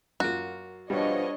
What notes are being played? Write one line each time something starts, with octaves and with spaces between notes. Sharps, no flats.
F#2 A#3 F4 F#4
B2 F3 G3 D4 C#5 D#5